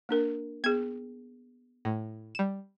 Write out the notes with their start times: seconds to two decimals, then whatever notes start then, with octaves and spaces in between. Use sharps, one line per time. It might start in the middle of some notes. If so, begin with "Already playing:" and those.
0.09 A#3 D4 A#4
0.64 B3 G#4 G#6
1.85 A2
2.35 G3 E7